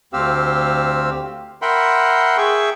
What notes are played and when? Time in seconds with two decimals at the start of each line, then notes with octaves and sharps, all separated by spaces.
0.13 D2 C4 G4 F5 E6
1.62 A#4 E5 F#5 G5 B5 C6
2.37 G#4 E5 G5 C#6